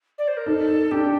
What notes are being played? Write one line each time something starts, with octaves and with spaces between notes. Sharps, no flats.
D5
C5
A#4
D#4 A4
D#4
D4 G4